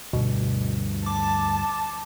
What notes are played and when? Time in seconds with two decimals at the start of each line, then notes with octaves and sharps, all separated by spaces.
0.13 D2 G2 B2
1.06 A5 D6